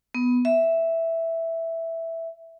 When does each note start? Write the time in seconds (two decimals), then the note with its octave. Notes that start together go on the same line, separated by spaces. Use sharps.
0.15 B3
0.45 E5